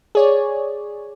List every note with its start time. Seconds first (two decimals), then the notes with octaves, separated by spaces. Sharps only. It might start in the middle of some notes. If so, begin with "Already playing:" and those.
0.15 G#4 C#5 D5